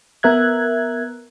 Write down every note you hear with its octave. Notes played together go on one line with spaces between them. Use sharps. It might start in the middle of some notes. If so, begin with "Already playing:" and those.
B3 A#4 E5 F#6 G#6